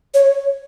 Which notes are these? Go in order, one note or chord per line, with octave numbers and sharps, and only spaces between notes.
C#5